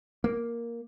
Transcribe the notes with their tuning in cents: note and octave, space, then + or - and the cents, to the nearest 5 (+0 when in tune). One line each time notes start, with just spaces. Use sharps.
A#3 +5